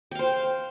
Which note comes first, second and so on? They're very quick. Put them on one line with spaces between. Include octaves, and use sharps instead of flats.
G5 F5 C5